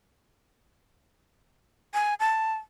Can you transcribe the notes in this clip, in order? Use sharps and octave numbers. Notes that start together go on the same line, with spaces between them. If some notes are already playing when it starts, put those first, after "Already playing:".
G#5
A5